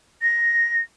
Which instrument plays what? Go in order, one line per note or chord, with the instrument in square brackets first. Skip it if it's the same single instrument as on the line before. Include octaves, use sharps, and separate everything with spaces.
[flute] A#6